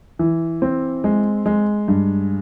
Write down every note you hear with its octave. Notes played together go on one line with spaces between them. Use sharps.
E3
C4
G#3
G#3
G2